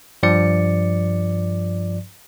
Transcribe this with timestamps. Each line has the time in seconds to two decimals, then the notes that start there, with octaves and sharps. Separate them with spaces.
0.23 G2 F3 D5 C#7